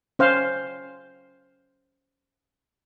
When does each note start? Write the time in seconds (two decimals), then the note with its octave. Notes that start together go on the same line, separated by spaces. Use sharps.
0.19 C#4 C5 F5